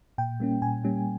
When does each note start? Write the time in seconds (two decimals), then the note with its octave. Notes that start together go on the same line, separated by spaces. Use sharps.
0.18 A#2 G5
0.40 G3 A#3 C#4
0.62 A#2 G#5
0.84 G3 A#3 C#4